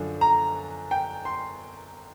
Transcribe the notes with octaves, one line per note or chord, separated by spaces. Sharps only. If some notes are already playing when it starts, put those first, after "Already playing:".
Already playing: F#2 D3 F3
A#5
G5
C6